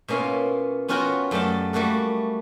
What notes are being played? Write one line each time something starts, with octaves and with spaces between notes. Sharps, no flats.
B2 A#3 C#4 E4 F4
B3 C#4 F4 F#4 A#4 G5
F#2 A3 G4 D5 G5 A5
G3 A3 A#3 F#4 A4